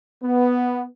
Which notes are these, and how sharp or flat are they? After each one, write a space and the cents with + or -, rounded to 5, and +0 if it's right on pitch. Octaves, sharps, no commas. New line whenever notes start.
B3 +0